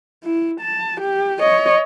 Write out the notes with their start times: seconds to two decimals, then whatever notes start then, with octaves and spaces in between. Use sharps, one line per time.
0.23 E4
0.60 A5
1.01 G4
1.40 C#5 D#5